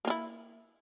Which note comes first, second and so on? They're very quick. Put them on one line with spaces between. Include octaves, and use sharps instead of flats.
A#3 F4 E4